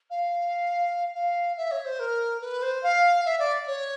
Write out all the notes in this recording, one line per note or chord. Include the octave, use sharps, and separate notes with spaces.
F5
F5
E5
C#5
C5
A#4
B4
C5
F5
E5
D5
C#5